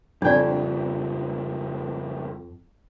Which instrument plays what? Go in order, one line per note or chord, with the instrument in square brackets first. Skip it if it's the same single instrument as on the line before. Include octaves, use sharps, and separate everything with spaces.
[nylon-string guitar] F2 G5 [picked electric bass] C#3 F3 G3 [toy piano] D4 D5